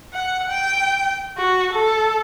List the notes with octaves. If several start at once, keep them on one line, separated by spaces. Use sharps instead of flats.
F#5
G5
F#4
A4